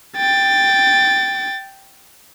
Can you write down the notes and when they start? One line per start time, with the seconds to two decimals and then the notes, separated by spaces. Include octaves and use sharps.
0.17 G5 A6